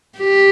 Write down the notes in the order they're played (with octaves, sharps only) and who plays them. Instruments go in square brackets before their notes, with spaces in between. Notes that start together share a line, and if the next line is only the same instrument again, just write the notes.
[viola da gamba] G4